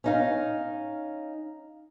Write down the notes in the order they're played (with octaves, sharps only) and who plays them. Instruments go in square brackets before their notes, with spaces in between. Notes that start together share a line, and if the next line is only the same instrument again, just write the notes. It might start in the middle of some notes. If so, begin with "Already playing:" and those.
[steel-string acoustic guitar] C#4 D#4 F5